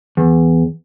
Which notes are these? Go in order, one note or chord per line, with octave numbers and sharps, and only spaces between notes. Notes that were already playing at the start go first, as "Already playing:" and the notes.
E2